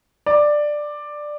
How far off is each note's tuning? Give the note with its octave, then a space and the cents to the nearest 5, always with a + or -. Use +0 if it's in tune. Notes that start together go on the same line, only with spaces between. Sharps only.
D5 +10